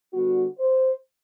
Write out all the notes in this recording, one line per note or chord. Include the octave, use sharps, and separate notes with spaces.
D3 G3 B3 F#4
C5